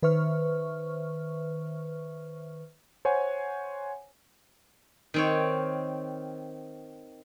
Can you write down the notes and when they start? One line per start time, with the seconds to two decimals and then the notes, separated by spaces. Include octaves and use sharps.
0.03 D#3 B4 C5 E5 C#6 F6
3.05 C5 C#5 F#5 G#5
5.14 D#3 C4 C#5